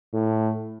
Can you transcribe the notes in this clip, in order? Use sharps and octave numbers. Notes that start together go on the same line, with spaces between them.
A2